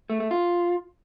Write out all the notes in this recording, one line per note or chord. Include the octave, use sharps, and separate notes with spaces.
A3
A3
F4